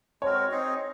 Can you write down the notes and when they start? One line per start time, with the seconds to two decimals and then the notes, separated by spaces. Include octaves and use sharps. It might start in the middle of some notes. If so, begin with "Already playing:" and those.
0.22 G#3 C4 F#4 A#4 C#5
0.51 C4 D#4 G#4 D#5